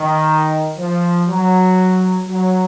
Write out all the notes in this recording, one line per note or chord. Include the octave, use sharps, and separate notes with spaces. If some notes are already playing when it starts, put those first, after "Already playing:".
Already playing: D#3
F3
F#3
F#3